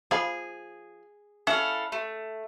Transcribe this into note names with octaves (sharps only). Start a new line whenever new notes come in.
F3 G#4 F5 B5
C#4 E4 A4 F5 F#5
A3